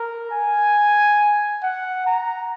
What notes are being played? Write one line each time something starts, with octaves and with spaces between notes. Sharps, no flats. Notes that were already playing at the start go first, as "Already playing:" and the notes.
Already playing: A#4
G#5
F#5
A#5